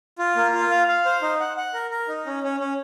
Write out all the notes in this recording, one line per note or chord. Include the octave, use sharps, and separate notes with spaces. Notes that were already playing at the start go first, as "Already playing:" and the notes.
F4
A#3
F4
F5
F5
C5
D#4
F#5
F#5
A#4
A#4
D#4
C#4
C#4
C#4